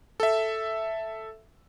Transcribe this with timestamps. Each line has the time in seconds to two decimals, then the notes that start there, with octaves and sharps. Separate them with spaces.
0.20 A4 E5